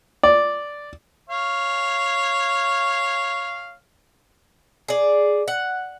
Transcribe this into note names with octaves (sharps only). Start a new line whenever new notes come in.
D5
C#5 F5
G#4 D5
F#5